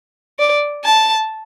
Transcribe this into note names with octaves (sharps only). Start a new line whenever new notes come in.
D5
A5